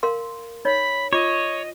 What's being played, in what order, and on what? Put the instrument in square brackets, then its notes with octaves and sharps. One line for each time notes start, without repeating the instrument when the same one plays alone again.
[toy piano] A#4 F5 C6
[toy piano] D#4 C#5 [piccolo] B5
[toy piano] F4 D6 [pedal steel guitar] C#5 [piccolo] D#5